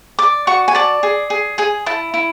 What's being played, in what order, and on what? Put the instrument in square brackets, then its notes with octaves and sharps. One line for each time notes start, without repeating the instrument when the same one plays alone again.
[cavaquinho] D5 D6
F#4 C#6
G#5
D5 A5
G#4
G#4
G#4 G#5
E4 A5
E4